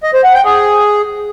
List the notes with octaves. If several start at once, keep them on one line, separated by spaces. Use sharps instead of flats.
D#5
C5
F#5
G5
G#4